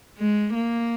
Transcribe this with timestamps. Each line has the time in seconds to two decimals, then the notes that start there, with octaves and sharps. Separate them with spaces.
0.18 G#3
0.54 A#3